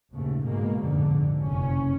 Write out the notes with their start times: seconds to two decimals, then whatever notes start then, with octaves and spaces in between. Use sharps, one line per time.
0.12 A#1 D#2 G#2 C#3 A3
0.44 G#2 B2 G#3 A#3
0.82 A#1 F2 G#2 B2 D3
1.44 F#1 F2 C3 C#4